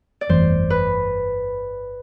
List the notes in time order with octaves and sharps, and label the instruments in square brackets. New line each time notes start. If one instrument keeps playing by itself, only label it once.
[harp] D5
[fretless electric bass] G1 F2 E3 A3 [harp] C5
[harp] B4